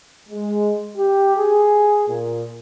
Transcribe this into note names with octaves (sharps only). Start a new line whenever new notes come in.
G#3
G4
G#4
A#2